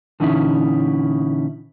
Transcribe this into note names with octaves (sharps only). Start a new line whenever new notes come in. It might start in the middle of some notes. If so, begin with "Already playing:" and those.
A#2 D3 E3 C#4 D#4 E4